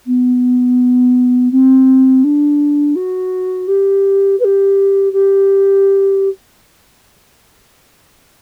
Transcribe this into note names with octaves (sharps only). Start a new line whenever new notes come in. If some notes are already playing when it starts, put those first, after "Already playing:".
B3
C4
D4
F#4
G4
B4
G4
G4